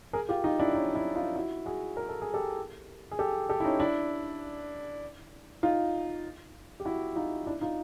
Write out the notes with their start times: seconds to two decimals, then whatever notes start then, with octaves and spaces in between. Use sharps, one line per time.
0.13 G#4 A#4
0.29 F4 G4
0.44 D#4 F4
0.59 D4 E4
0.74 C#4 D#4
0.95 D4 E4
1.15 D#4 F4
1.36 E4 F#4
1.66 F#4 G#4
1.97 A#4
2.09 A4
2.22 G#4
2.34 G4 A4
3.11 G#4
3.19 G4 A4
3.49 G4 A4
3.60 E4
3.65 C#4 D#4
3.80 D4 E4
5.63 D#4 F4
6.80 G4
6.85 E4 F#4
7.16 D#4 F4
7.46 D4 E4
7.61 D#4 F4